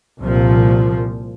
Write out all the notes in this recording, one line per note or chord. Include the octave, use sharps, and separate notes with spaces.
C2 A#2 F3